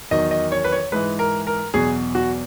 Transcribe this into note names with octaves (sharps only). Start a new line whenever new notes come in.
E2 D#3 F#3 D#5
D#5
C#5
B4
C#5
G#2 E3 G#3 B4
A#4
A#4
E2 B2 F#3 G#4
F#4